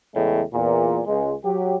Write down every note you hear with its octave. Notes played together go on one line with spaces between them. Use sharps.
E2 A2 C#3 G#3 A3
E2 A#2
C#2 G#3
F#3 G4